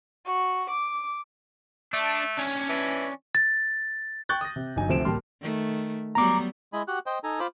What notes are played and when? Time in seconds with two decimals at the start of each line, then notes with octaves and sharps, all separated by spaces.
0.24 F#4
0.70 D6
1.93 A3 D4
2.37 C#4 D4
2.69 E3
3.35 A6
4.29 G5 C#6 F#6 G6 A6
4.41 D#6 A#6
4.56 C3
4.76 G1 F#3 D#4 G#5
4.89 D2 C3 F3 C5 D7 E7
5.05 D1 G3 A#3 A5 C6 F6
5.42 D#3 A3
6.15 F#3 G3 B3 A#5 D6
6.73 G#3 E4 D#5 G#5 B5
6.88 F#4 G4 F#5 F#6
7.06 C5 D#5 G5
7.24 D#4 A4 G#5 A#5
7.40 F4 C5 B5 D6